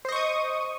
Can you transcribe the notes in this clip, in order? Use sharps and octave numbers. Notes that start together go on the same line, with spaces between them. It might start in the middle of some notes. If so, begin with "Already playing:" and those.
C5 D#5 C#6 D#6